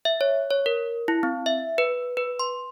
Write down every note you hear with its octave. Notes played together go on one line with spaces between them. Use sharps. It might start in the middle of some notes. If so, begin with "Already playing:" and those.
E5
C#5
C#5
A#4
E4
C4
E5
B4
B4
C6